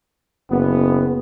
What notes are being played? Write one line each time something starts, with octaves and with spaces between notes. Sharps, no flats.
F#1 B3